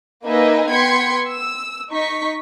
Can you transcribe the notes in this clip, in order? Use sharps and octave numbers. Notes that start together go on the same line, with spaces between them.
A#3 D#4 B4 D#5 E5 G#5
B3 G5 C6 G#6 B6 C#7
E6
D#4 C#6 B6